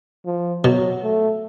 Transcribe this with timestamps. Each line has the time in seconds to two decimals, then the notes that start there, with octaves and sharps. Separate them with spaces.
0.26 F3
0.64 B2 F#3
1.03 A3